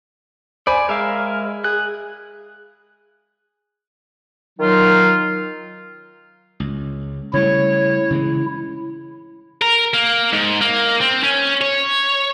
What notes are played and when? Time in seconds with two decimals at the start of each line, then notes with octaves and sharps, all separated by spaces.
0.67 C5 D5 G#5 B5
0.89 G#3 A#4 E5 F5
1.64 G#4 F#6
4.59 D#3 F#3 D#4 F4
6.60 C#2
7.33 C#3 G3 A3 E4 C#5
8.10 C#3 E3 G#3
9.62 A#4
9.94 A#3
10.33 G#2
10.61 A#3
11.01 C4
11.23 C#4
11.62 C#5